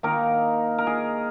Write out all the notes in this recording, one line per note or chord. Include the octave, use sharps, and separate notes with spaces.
D#3 A#3 D#4 A#4
A#4
G#4